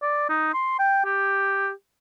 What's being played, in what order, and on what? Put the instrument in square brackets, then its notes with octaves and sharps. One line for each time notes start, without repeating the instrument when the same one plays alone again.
[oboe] D5
D#4
C6
G5
G4